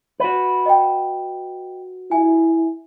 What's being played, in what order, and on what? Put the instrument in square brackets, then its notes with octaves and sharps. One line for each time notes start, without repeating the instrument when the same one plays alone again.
[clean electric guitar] F#4 B4
[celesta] D#5 G5
[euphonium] E4 [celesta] G#5